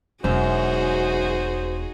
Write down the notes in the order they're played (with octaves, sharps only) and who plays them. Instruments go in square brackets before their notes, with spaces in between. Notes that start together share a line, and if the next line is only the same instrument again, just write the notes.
[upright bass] E1 [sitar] F#2 [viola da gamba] D#4 F#4 G#4 [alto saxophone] C5